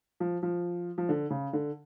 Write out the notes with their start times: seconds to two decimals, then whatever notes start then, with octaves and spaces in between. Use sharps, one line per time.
0.20 F3
0.43 F3
0.98 F3
1.09 D3
1.31 C#3
1.53 D3